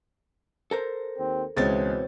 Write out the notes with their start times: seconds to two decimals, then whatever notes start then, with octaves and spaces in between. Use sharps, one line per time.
0.71 A4 A#4 C5
1.17 D#2 C4
1.57 C#2 B2 E3 G#3 C4 C#5 A6